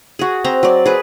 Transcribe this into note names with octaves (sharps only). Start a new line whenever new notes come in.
F#4 G#4
C4 C5 A#5
F#3 D5
G#4 B4